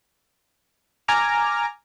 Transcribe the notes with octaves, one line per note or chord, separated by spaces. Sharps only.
G#5 A#5 D6 F6